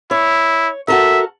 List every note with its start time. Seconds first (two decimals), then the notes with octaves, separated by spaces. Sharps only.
0.11 E4 C#5
0.88 F#4 A4 A#4 E5